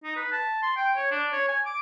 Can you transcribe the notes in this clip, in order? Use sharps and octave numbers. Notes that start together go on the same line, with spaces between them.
D#4
B4
A5
C6
G5
C#5
D4
C#5
G#5
D6